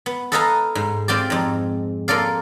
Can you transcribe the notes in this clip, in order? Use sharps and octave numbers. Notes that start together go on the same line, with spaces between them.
B3
A4 B4 D#5 F5 G#5 A#5
G#2
C4 F4 G4 D5
F2 G#2
A#3 F4 A4 D5 F5